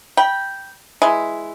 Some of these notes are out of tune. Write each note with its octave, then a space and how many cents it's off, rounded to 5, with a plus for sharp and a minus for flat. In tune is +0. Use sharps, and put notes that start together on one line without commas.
G5 +0 B5 -25
E3 +0 G#3 +0 E4 +0